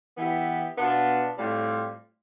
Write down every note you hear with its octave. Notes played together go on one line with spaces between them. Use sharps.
E3 B3 E4 G4
B2 B3 D4 F4
A2 G3 C4 F4